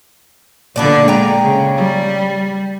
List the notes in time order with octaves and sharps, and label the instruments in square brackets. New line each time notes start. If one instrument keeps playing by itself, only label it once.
[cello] A#2 D3 [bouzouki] B3 D4 D5
[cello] G#3 [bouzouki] G5 A#5
[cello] C#3
G3